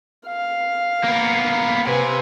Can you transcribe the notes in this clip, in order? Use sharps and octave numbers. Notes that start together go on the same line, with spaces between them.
F5
A#3 B3
C3 B4 G#5